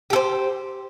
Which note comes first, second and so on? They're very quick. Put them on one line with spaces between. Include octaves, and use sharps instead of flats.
G4 A4 C5